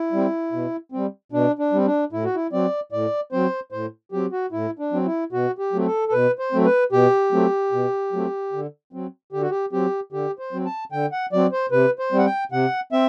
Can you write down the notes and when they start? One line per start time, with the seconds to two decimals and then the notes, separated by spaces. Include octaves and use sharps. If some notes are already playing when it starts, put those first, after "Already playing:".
Already playing: E4
0.12 G3 C4
0.52 B2
0.92 G3 C4
1.32 B2 D4
1.59 D4
1.72 G3 C4
1.86 D4
2.12 A2 E4
2.24 F#4
2.35 E4
2.52 F#3 C4 D5
2.92 A2 D5
3.32 F#3 C4 C5
3.72 A2 C5
4.12 F#3 C4 G4
4.32 F#4
4.52 A2 E4
4.79 D4
4.93 F#3 C4
5.06 E4
5.32 B2 F#4
5.59 G4
5.73 F#3 A3 C4
5.86 A4
6.08 A4
6.13 B2 B4
6.39 C5
6.52 F#3 A3 C4
6.65 B4
6.92 B2 G4
7.32 F#3 A3 C4
7.72 B2
8.12 F#3 A3 C4
8.53 D3
8.93 F#3 C4
9.33 D3 G4
9.41 F#4
9.50 G4
9.72 F#3 C4 G4
10.12 D3 G4
10.39 C5
10.53 F#3 C4
10.66 A5
10.92 D3 G5
11.12 F#5
11.33 F#3 C4 D5
11.52 C5
11.72 C3 B4
11.99 C5
12.12 G3 C4
12.18 F#5
12.26 G5
12.52 C3 F#5
12.92 C4 E5